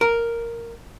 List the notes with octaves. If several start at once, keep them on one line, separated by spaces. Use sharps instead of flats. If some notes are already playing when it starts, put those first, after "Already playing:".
A#4